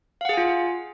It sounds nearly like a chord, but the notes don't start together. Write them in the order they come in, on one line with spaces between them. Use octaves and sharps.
F5 F#5 G#4 G#5 F4